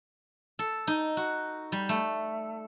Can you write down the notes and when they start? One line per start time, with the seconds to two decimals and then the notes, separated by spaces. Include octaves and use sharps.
0.59 A4
0.87 D#4
1.17 F#4
1.72 G3
1.89 A3